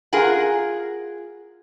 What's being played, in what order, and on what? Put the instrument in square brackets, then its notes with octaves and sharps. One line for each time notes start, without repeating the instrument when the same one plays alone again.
[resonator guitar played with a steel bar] F4 G#4 A#4 F#5